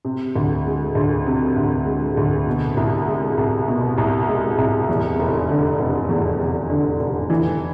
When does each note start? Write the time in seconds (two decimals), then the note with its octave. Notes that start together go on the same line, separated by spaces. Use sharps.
0.05 C3
0.36 D2
0.66 G#3
0.95 D2
1.26 C3
1.56 D2
1.86 G#3
2.17 D2
2.47 B2
2.77 C2
3.07 G#3
3.37 C2
3.68 B2
3.98 C2
4.29 G#3
4.58 C2
4.89 E2
5.19 F1
5.49 D3
5.79 F1
6.09 E2
6.40 F1
6.69 D3
7.00 F1
7.30 E3